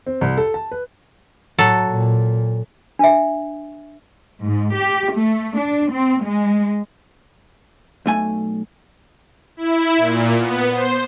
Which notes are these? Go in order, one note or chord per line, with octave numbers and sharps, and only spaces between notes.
C4
C2
A4
A5
B4
A2 F#3 A4
A#2
D4 E5
G#2
G4
A3
D4
C4
G#3
B1 A3 G#5
E4
A#2
B3
C5